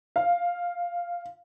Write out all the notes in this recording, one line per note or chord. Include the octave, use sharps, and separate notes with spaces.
F5